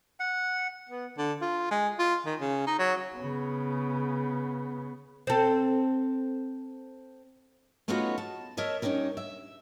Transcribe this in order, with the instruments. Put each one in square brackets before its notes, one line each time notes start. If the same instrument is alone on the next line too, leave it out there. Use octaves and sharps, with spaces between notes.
[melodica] F#5
[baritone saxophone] B3
D3
F4
G#3
F4
D#3
C#3
D#4
F#3
[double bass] C#3 B3
[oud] C4 A4
[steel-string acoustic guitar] A3 B3 C#4 D#4 F4 F#4
A5
A#4 C#5 D#5 E5 A5
G2 C#4 D#4 G4 A#4
E5